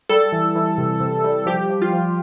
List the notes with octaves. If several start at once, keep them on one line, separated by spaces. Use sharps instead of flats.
G3 A4
E3
E3
C3
C3
G3
F3 G4
F3
F4
F3